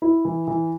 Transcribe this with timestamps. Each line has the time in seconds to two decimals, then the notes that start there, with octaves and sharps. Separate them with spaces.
0.02 E4
0.25 E3
0.48 E3